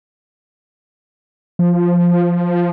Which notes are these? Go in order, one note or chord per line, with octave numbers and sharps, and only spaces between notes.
F3